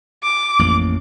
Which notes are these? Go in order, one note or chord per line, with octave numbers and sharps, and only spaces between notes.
D6
A1 F2 A#3